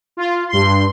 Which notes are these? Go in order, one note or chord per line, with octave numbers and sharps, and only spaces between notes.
F4
G2 C6